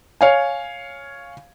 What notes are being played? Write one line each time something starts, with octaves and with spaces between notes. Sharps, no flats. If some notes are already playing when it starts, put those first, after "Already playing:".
C#5 F5 G#5